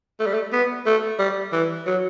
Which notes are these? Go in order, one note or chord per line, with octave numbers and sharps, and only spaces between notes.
A3
G3
A3
B3
A3
G3
E3
F#3